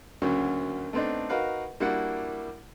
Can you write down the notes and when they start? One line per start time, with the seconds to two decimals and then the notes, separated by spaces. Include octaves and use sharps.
0.22 D2 C#3 F#3 A#3 C#4
0.93 A3 B3 C4 D4 D#4
1.29 D#4 F#4 A#4 B4 F5
1.80 G3 A#3 D4 E4 F#4 F#5